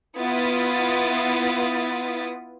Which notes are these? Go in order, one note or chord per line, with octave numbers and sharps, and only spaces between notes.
B3 E4 F4 D#6 A6 B6